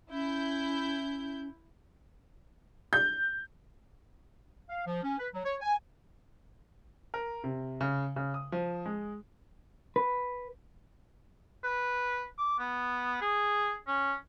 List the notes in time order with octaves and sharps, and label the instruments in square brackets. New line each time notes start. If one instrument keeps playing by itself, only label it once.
[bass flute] C#4 [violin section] E4 G6
[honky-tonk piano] G6
[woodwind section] F5
F3
C#4
B4
F#3
C#5
G#5
[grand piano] A#4
C3
C#3
C#3
D#6
F3
G#3
[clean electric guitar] B4
[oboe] B4
D6
B3
G#4
C#4